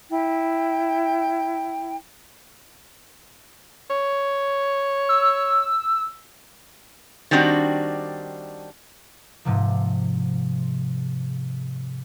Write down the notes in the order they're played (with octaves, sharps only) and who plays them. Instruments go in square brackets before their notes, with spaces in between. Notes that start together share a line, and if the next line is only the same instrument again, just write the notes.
[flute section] E4 G5
[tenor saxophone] C#5
[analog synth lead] E6
[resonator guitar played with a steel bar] D#3 G3 C4 D4 F#4
[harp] G#2 C3 F3